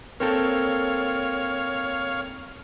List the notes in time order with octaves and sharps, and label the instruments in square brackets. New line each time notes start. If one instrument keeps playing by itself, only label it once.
[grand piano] A#3 C4 A4 [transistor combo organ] C#5 F5